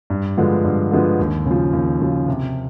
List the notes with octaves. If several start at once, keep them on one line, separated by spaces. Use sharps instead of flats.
G2
D3 F3 G#3 B3
G2
D3 F3 G#3 B3
D#2
C#3
F3
D#2
C#3 F3
C3